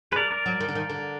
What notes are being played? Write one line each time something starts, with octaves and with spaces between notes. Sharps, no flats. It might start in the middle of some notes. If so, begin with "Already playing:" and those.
G#3 B4
A#4 D5
A#4 D5
F#3
D#3
D3
D#3
D3